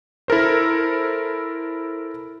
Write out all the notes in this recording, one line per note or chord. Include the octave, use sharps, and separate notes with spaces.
E4 A4 A#4 C5